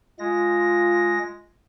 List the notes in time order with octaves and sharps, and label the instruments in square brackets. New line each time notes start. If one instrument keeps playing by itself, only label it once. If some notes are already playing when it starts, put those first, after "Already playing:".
[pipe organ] G#3 A#6 [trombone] F4